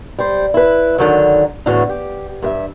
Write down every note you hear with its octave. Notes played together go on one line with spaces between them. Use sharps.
G3 C5
E4 B4
D3 D#3 F#3
E2 A2 D3 E3 F#4
G4
G2 B4 E5